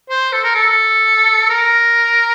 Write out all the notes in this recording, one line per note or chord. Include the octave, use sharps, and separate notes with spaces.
C5
A4
A#4
A4
A#4